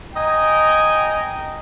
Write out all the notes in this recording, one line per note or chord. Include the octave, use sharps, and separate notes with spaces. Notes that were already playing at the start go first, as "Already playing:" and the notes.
D#5 G5 G#5 A#5